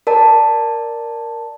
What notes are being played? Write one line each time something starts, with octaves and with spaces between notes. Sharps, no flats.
A#4 D5 A5